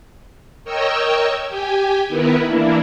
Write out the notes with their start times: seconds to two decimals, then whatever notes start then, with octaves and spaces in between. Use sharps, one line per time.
0.64 A#4 C#5 D#5 G5 C#6 E6
1.48 G4 G5 G#5
2.08 D#3 B3 E4 A#4 B4
2.45 E3 A#3 D4 E4